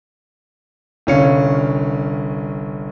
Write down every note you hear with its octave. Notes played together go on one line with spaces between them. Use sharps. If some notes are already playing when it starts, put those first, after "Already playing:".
G1 C2 C#4 F5 C#7